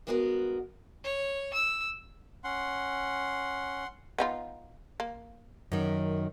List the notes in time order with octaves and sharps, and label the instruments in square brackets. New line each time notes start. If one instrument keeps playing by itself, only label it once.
[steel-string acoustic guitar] G2 G#3 B3 F#4 G#4 A#4
[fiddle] C#5
E6
[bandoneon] C#4 [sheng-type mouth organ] F#5 C6
[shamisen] B3 D#4 F4
A#3
[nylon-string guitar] F#2 D#3